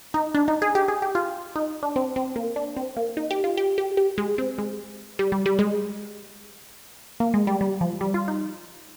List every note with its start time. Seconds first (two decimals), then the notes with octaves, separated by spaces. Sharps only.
0.14 D#4
0.35 D4
0.48 D#4
0.62 G#4
0.75 G4
0.88 G#4
1.02 G4
1.15 F4
1.56 D#4
1.83 D4
1.96 C4
2.16 C4
2.36 A#3
2.56 D4
2.76 C4
2.97 A#3
3.17 D#4
3.31 G4
3.44 F4
3.57 G4
3.78 G4
3.97 G4
4.18 G#3
4.38 C4
4.58 G#3
5.19 G3
5.32 G3
5.46 G3
5.59 G#3
7.20 A#3
7.34 G#3
7.47 G3
7.61 G3
7.81 F3
8.01 G3
8.14 F4
8.28 D#4